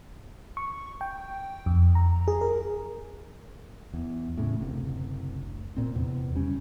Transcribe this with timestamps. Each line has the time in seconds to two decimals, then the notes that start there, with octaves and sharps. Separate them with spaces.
0.57 C#6
1.01 G5
1.66 F2
1.95 A#5
2.28 G#4
2.41 A#4
3.94 E2
4.38 A2 C#3
4.60 F#1 D2 C3
5.77 A#2 C4
5.95 E2 C3
6.34 F#1 G3 C#4